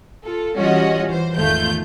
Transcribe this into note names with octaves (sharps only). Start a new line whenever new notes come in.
F4 A4
E3 G3 C#4 F4 F#4 D#5
E3 C5
G#1 E2 D#3 A3 F4 G6